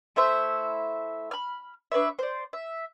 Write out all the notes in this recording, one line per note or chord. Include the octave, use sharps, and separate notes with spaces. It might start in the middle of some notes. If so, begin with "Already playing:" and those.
A3 E4 C5 E5
B5 F6
D4 B4 C#5 E5
C5 D5
E5